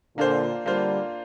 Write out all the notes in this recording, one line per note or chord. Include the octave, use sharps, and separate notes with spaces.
A#2 D3 A#3 D4 F4 C5
D3 G3 A#3 D4 F4 C5